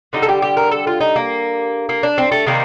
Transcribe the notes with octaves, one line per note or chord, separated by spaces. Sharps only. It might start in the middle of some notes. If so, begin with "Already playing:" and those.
D3 G3 D#4
A4
G4
G4
A#4
A4
F4
D#4
A#3
A#3
D4
C4
A3
C3 D#3 G3 A#3